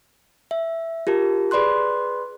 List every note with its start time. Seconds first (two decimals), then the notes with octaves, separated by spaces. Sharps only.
0.51 E5
1.07 F4 G4 A#4 A5
1.51 G#4 B4 D5 B5 C6 F#6